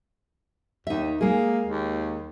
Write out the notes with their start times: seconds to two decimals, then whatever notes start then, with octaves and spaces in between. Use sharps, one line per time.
0.87 D#2 D#4 E5
1.21 G#3 A#3 G#4
1.65 D#2